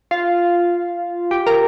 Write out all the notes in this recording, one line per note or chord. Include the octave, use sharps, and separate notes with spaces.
F4
G4
A#4